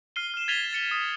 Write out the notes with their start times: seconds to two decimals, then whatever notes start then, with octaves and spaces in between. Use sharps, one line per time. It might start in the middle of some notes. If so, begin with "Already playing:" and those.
0.16 F6 C7 D#7 G7
0.34 F6 E7
0.48 G#6 A6 B6 D#7 F7 G7
0.73 A6 C#7 G7
0.91 D#6